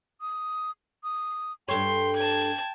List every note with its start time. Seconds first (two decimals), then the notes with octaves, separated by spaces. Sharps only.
0.21 D#6
1.04 D#6
1.69 G2 A4 C#5 G5 C6
2.16 A5 G#6